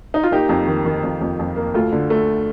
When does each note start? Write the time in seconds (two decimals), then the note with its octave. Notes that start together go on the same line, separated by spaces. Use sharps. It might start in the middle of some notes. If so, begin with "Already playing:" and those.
0.14 D#4
0.23 F4
0.31 A#3 D#4 G4
0.49 F2
0.67 D#3
0.85 D#3
1.04 F2
1.21 F2
1.39 F2
1.56 A#3
1.74 D2 F4 A4
1.92 D3
2.10 A3